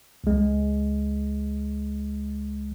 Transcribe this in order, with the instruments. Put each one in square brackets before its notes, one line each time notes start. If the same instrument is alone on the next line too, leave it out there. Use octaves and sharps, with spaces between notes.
[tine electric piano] C#2 G#3